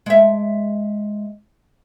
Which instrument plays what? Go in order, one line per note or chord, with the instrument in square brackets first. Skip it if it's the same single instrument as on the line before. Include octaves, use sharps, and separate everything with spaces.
[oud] G#3 E5